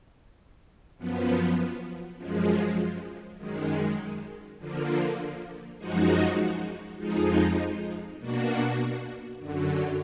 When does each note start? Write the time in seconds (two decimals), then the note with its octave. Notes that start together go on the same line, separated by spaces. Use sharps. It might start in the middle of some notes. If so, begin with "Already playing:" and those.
0.97 F#2 F3 B3
2.18 F#2 F3 G#3
3.38 F#2 D#3 G#3
4.58 D3 F3 A#3
5.78 F#2 F3 G#3 D#4 F#4
6.99 F2 F3 G#3 D#4
8.19 B2 A#3 D4 F#4
9.39 F#2 D3 F#3